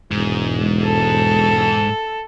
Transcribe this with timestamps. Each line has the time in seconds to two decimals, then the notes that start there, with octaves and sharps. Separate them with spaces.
0.11 E1 G#2
0.84 A4